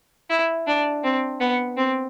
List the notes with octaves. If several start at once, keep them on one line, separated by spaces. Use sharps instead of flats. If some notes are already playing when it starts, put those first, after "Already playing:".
E4
D4
C4
B3
C4